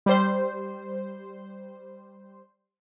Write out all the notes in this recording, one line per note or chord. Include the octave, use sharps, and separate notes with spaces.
G3 C5